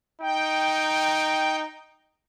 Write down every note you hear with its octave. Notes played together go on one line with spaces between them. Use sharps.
D#4 G5